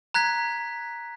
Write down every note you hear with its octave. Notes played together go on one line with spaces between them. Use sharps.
A#5 F#6 G#6 B6